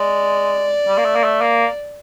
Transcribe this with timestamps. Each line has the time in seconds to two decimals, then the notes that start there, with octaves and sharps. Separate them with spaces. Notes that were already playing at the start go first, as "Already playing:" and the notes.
Already playing: G#3 D5
0.87 G3
0.98 A#3
1.05 A3
1.15 A#3
1.24 A3
1.41 A#3